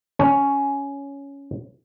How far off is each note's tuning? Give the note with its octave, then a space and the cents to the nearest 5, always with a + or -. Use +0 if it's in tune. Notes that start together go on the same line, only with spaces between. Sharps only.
C#4 +10